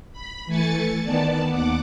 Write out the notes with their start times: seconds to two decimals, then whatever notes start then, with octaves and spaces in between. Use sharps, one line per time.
0.13 B5
0.46 E3 A3 G#5 A6 C#7
1.03 D#3 B3 D5 A5
1.50 D#2 F#5 D6